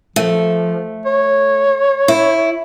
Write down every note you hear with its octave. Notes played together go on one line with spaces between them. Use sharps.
F3 A3
C#5
E4